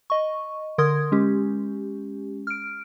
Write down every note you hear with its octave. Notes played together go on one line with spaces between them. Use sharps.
D#5 C#6
D3 A#4 C6 D#6 G#6
G#3 C#4 G4
F6 D7